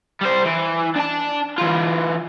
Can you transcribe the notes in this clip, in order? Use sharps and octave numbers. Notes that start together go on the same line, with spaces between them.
G3 C5
E3
D4 A5
E3 F4